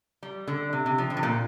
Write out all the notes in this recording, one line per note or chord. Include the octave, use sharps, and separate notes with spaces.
G3
D3
C3
C3
F3
D3
C3
A#2